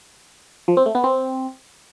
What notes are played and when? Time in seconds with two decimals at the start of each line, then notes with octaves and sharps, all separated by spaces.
0.68 F3
0.77 C4
0.86 A3
0.95 B3
1.04 C4